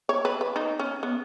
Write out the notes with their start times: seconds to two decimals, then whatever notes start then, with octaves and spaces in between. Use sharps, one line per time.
0.09 C#5
0.25 B4
0.41 B4
0.56 D#4
0.79 C#4
1.03 B3